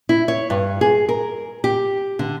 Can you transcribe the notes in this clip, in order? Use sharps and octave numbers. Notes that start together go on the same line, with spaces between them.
E4
C#5
G2
G#4
A#4
G4
D3